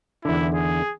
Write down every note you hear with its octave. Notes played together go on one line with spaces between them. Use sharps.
E2 D3 E4
G#4